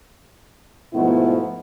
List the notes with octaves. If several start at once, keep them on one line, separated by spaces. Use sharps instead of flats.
G#2 B2 F3 A3 B3 E4